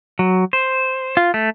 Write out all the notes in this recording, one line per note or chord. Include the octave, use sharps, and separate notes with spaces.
F#3
C5
F4
A3